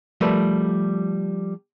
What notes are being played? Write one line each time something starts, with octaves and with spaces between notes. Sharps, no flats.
F3 G3 A3 A#4 B4